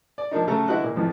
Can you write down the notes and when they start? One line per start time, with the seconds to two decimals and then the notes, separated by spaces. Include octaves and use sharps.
0.18 D5
0.31 F3 A#3 D4 D#4
0.47 C#3 F#3 A3 A4 A#5
0.68 D3 E4 F#4 B4 D#5 F#6
0.84 A#2
0.96 F2 E3 F3